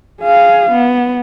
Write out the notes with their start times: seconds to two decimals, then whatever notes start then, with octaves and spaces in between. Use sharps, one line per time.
0.22 G#4 F5
0.72 B3